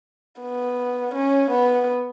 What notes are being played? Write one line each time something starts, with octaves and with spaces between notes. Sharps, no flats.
B3
C#4
B3